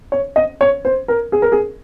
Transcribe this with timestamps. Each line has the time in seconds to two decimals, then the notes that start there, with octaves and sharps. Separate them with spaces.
0.12 C#5
0.36 D#5
0.61 C#5
0.85 C5
1.08 A#4
1.32 G#4
1.42 A#4
1.52 G#4